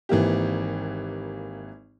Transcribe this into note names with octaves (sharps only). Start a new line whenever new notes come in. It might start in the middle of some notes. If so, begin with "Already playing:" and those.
G#1 E3 A#3 G4